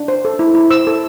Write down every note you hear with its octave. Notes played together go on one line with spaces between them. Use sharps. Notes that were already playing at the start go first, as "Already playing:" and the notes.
Already playing: D4
C5
A4
E4
E4
C5 E6
A4